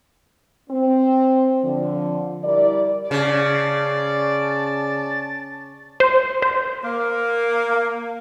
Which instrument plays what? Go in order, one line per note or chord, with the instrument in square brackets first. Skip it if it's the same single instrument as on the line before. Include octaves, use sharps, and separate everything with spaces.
[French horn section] C4
D3 F3
G3 E4 A#4 D5
[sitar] C#3 [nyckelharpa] D5 [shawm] A5
[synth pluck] C5
C5
[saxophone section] A#3